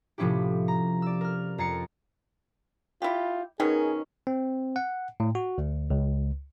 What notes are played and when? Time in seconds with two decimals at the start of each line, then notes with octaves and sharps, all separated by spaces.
0.18 A2 C3 F3 C#4 E4 G4
0.68 A#5
1.02 D5 E6
1.21 A#4 F6
1.58 F2 A#5 A6 C7 C#7
3.02 E4 F4 G4
3.60 B2 D#3 C#4 D#4 G#4 A#4
4.27 C4
4.76 F#5
5.20 A2
5.35 F#4
5.58 D2
5.90 C#2